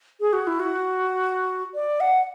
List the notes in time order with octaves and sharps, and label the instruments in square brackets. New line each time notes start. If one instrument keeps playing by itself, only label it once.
[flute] G#4
F#4
E4
F#4
D5
F#5